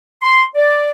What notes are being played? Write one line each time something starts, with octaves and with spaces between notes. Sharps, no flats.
C6
D5